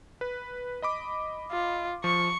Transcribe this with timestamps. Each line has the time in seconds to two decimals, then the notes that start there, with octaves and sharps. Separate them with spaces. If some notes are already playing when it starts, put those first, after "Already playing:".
0.21 B4
0.82 D#5 B5 D6
1.51 F4
2.04 F3 C#6